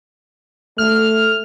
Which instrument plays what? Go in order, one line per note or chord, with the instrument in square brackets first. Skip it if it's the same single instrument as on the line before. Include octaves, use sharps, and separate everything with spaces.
[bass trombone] A3 [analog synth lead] F6